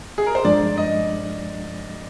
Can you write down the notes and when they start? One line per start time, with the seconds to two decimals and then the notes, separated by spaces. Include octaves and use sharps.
0.18 G#4
0.26 A#4
0.35 C5
0.44 G2 F3 G#3 D4 D5
0.78 D#5